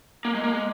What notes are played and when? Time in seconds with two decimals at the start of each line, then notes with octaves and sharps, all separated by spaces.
0.25 A#3
0.35 G#3
0.43 A#3
0.53 G#3